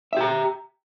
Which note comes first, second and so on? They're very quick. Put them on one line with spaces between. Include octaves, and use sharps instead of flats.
E5 G4 A#5